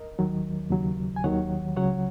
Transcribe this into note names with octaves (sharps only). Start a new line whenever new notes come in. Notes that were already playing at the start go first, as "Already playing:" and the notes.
Already playing: A#4 D#5
D#2 D#3 F#3
D#2 C#3 F#3
G#5
D#2 D#3 F#3 C#5 F#5
C#2 C#3 F#3 C#5 F#5